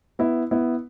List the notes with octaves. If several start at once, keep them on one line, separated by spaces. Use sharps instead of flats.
B3 E4
B3 E4